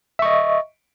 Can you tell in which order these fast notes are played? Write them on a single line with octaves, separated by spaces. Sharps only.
E5 C#6 D#5